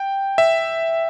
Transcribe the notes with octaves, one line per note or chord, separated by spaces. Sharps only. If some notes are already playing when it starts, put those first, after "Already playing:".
Already playing: G5
E5